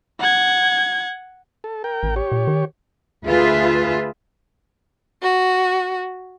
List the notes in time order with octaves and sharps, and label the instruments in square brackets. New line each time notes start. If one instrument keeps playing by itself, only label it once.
[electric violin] F#5 G#6
[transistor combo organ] A4
A#4 G5
[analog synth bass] A1
[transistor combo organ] G4 C#5
[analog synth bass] A#2
D#3
[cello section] D2 F4 G#4 B4 E5
[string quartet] F#4